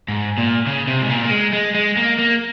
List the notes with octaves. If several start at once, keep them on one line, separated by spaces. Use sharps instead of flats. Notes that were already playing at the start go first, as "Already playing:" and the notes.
G#2
A#2
C#3
C3
G#2
A#2
A#3
G#3
G#3
G#3
A#3
A#3